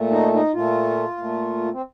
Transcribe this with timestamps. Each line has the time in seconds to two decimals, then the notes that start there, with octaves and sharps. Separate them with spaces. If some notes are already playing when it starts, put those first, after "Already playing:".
Already playing: A#2 A3
0.11 D#4
0.33 D#4
0.53 A#2 A3 F4
1.17 A#2 A3
1.73 C4